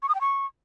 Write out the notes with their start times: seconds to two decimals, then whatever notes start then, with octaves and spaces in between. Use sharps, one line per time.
0.03 C#6
0.09 D#6
0.15 G5
0.21 C#6